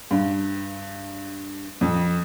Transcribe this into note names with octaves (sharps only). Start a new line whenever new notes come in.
G2
F2